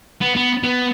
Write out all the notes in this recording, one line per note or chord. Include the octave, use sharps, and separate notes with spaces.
B3
B3
B3